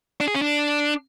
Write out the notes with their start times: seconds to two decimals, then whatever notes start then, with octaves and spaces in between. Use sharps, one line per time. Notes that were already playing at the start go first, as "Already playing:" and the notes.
0.20 D4
0.27 G#4
0.35 C#4
0.42 D4